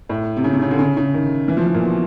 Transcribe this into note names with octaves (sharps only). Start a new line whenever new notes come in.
A2
C3
C#3
C3
C#3
D3
C#3
C#3
D#3
E3
F3
E3
A#2
B2